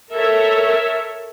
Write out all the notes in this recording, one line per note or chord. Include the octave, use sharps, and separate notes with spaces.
A4 A#4 C#5 E5